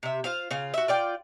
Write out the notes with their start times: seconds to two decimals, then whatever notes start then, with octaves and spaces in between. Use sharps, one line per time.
0.03 C3 E5
0.24 F4 C5 F5
0.51 C#3 F4
0.74 F#4 E5
0.88 F4 D5 G5